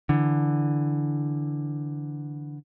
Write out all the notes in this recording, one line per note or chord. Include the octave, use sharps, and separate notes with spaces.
D3 E3